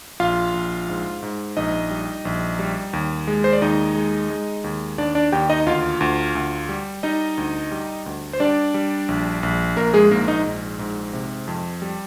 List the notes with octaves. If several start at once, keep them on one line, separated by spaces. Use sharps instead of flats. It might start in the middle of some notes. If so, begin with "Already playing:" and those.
A#1 F4 F5
A#1
G#2
G#2
A#1 D#4 D#5
G3
A#1
G3
D#2
G#3
C5
D5
D#2 D#4 D#5
G#3
G#3
D#2
D#2 D4 D5
D4 D5
D#2 G4 G5
D#4 D#5
D2 F4 F5
D2
D2
G3
G3 D#4 D#5
D2
G3
D2
C5
G3 D4 D5
G3
A#1
A#1
A#1 A#3 A#4
G#3 G#4
G#2 A#3 A#4
D#4 D#5
A#1
G#2
C3
F2
G3